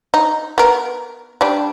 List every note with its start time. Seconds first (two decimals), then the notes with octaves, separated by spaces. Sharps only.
0.14 D#4
0.58 B3 A#4
1.41 G3 D4